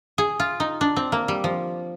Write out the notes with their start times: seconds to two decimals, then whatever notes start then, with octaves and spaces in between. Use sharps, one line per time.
0.18 G#4
0.40 F4
0.60 D#4
0.81 D4
0.96 C4
1.12 A#3
1.28 G3
1.44 F3